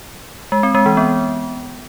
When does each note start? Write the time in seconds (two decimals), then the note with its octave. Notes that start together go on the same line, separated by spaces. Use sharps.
0.52 G#3
0.63 C4
0.75 G#3
0.86 E3
0.97 B3